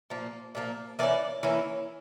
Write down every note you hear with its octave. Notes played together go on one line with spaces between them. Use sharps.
A#2 F3 A#3
A#2 F3 A#3
E3 A#3 C#4 E4 A#4 D5
E3 A#3 C#4 E4